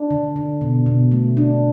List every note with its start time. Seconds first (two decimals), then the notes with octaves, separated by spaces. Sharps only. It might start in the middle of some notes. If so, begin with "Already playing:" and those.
Already playing: D4
0.11 D3
0.36 D3
0.61 B2
0.86 B2
1.12 A3
1.37 D4